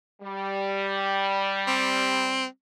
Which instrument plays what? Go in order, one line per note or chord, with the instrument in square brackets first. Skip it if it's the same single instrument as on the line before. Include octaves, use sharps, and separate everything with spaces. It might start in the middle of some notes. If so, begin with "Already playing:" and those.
[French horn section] G3
[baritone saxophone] C4